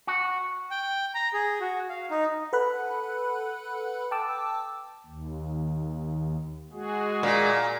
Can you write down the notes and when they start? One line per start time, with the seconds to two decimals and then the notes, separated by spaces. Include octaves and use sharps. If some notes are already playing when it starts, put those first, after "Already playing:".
0.07 F#4
0.71 G5
1.15 A#5
1.33 G#4
1.60 F#4
1.89 F5
2.10 D#4
2.53 A4 B4 F#5 B5 F#6
4.11 G5 A5 D6 E6
5.06 D#2
6.73 G#3 F#4 G#4
7.23 A#2